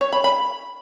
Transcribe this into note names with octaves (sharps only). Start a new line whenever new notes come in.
C#5
B5
B5